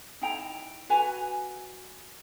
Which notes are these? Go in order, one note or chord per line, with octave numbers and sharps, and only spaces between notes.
D#4 E4 G5 A#5
F#4 B4 G#5 A#5